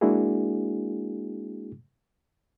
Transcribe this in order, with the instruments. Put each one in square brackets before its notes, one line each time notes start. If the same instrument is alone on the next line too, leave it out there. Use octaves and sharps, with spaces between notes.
[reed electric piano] G#3 A#3 D4 E4 F#4 G#4